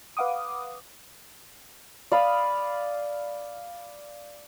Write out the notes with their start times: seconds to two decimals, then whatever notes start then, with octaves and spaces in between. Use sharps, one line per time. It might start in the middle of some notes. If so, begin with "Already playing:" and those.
0.17 B4 F5 F#5 D6 D#6
2.12 D5 F5 B5 D#6